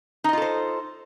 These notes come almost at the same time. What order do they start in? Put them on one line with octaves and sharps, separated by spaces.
D#4 D#5 F4 A4 C5